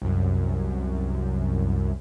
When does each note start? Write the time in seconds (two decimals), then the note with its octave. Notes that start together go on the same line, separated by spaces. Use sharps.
0.02 C2 F#2